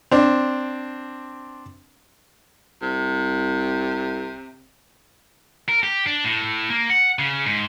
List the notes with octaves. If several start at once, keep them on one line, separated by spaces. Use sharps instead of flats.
C4 D4
C2 C3
A#4
G4
D4
A2
A#3
F#5
C#3
G#2